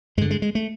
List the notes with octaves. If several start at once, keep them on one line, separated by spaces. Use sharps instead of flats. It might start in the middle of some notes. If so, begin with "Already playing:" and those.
G2 D3 G#3
G#3
G#3
A3